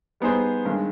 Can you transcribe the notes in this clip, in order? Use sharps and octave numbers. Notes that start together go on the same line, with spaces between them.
G3 B3 D#4 G#4 C5
G2 D#3 G#3